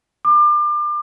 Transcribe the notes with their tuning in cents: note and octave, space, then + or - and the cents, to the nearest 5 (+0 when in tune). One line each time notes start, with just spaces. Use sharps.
D6 +35